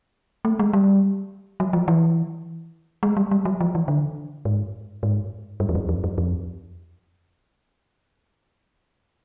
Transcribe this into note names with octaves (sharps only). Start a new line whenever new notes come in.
A3
G#3
G3
F#3
F3
E3
G#3
G3
G3
F#3
F3
E3
D3
G#2
G#2
G2
F2
F#2
F2
F#2
F2